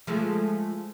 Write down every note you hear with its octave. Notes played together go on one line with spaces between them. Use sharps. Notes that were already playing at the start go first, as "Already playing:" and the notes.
F3 G#3 A3